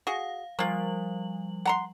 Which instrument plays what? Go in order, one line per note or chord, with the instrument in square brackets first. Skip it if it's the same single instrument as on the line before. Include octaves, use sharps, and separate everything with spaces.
[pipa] F#4 G#4 [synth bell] F5
[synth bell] F3 G3 F#7 [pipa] A#3 F4
[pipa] F#5 A#5 C6